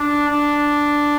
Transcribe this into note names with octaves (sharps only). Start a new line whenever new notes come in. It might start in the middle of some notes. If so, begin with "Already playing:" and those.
Already playing: D4
D4